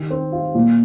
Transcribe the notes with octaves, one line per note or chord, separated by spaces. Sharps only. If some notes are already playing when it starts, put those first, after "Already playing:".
Already playing: D#3 G4
C4
F4
A#2